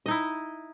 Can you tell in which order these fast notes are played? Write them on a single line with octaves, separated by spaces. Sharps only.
D#5 D#4 E4